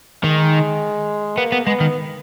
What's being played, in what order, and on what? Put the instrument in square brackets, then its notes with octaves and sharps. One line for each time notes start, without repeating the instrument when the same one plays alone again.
[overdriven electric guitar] D#3 [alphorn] G#3
[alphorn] A#3 [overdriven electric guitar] B3
[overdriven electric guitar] B3
[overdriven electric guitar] G#3 [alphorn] B3
[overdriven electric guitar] D#3